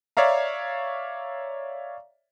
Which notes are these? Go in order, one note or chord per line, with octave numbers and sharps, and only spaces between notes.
C#5 D5 E5 F5 A#5